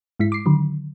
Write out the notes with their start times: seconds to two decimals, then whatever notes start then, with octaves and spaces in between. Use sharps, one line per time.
0.19 G#2 G#3 E4 B6
0.32 D6 C7
0.46 D3 D#3 F#3